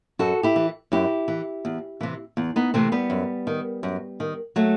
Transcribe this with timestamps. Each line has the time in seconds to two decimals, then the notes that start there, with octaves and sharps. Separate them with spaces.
0.19 F#2 F#4 A4
0.43 E4 G4
0.56 E3
0.92 F#2 E4 G4
1.28 E3
1.65 E2
2.01 C3 E3
2.37 E2
2.56 B3 D#4
2.74 C3 E3 A3 C4
2.92 G3 B3
3.10 F#2
3.47 D#3
3.83 F#2
4.20 D#3
4.56 F#3 A3